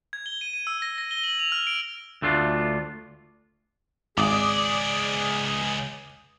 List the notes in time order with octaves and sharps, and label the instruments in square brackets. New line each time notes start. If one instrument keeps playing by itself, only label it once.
[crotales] G#6
G7
D#7
D#7
E6
A#6
A#6
G7
F#7
F7
F6
D7
[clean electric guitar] D2 A3 D4 F4
[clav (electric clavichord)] G#1 [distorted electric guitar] C#2 D5 [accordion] G#4 [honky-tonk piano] D6 D#6